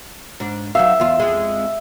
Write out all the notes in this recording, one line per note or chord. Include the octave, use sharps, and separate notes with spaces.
G#2 D4
F#3 D#4 E5 F5
E2 F4
F2 G#3